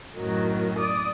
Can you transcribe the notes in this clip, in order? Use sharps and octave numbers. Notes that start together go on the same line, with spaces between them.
F#2 A2 D#3 F#3
D5 D#6